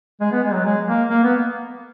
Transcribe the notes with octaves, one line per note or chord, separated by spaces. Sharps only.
G#3
B3
G#3
F#3
G#3
A#3
A#3
B3